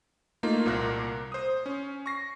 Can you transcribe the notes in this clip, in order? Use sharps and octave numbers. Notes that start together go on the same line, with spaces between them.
A3 A#3 D#4 F4
C2 A#2 A#3 A#4 F#6
C5 D#6
C#4
C#6 A#6 C7